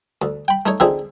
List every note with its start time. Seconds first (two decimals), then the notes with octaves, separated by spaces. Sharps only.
0.22 D2
0.48 G5 B5
0.66 A3 D#4 C#5
0.80 D3 F3 C4 D#4 G#4 E5